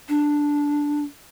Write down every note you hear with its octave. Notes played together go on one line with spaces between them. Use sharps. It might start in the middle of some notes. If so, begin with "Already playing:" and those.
D4